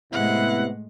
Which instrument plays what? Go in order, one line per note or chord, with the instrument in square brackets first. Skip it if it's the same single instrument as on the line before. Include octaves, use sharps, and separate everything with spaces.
[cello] A2 G#3 [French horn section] C3 B3 [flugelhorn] E4 [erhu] F#5